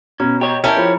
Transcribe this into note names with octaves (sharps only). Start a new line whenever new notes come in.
B2 C#4 A#5
G4 C#5 D#5
C#4 E4 G4 A#4 C#5 E5 A5 A#5
F3 G#4 C5 B5